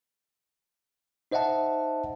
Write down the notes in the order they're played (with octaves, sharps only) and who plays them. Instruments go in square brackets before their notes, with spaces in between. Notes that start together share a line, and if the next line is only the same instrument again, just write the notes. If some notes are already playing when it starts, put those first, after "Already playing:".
[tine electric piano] D#4 C5 D#5 E5 F#5 A5